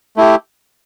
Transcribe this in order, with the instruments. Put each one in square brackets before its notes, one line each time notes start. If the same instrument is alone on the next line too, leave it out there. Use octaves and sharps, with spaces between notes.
[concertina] A3 E4 G4